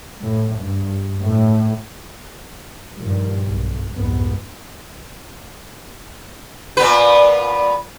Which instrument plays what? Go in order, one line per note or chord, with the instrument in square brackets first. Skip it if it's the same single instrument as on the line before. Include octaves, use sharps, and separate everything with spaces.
[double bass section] A2
G2
A2
G2 A#2 D#3 F3 G3
F#1 B1 G2
C2 F2 G#2 B3
[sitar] A#2 B3 B4